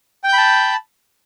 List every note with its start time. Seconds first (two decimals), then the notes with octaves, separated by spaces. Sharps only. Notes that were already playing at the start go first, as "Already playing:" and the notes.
0.24 G5
0.28 G6
0.33 B5
0.38 A5